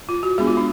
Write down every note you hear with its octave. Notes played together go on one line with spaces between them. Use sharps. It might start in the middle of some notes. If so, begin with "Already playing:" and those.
F4
F#4
G#3 B3 D4 G#4
F4
D4